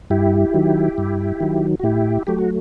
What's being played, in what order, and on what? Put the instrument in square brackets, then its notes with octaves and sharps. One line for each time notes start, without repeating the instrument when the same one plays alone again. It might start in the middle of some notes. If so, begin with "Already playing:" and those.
[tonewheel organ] G2 E4 G4
D#3 F#3
G2
D#3 F#3
F#4
A2 E4 G4
F#3 A3 G4
F#4